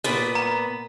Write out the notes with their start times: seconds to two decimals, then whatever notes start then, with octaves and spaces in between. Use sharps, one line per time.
0.04 A#2 B3
0.35 A#5